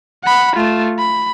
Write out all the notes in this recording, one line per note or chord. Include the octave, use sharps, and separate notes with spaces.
F#5 B5
A3 F4
B5